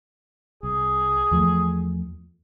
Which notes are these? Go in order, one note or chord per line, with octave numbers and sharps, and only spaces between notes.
C2 G#4
E2 F3 A3